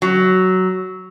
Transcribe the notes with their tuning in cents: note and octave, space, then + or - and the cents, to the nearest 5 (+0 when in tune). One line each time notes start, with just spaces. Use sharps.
F#3 +10